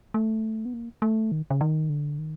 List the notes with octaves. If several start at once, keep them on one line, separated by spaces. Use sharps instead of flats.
A3
B3
A#3
A3
D#3
C#3
D#3
D3
D#3